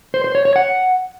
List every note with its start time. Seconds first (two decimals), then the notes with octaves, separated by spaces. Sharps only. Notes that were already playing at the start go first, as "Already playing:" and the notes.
0.14 C5
0.24 C5
0.35 C#5
0.45 C#5
0.56 F#5